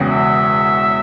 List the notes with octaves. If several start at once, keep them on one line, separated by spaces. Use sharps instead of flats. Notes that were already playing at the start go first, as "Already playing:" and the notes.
Already playing: E1 E2 C#3
E5